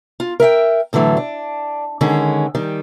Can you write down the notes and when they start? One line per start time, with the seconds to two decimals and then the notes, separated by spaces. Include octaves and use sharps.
0.20 F4
0.40 A#4 E5 F#5 G5
0.93 A2 D3 E3 F#3 A3
1.17 D4
2.01 D3 D#3 G#3 C#4
2.55 D#3 G3